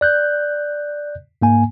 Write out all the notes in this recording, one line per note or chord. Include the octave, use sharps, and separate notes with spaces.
D5 F#6 G6
G#2 A#3 G#5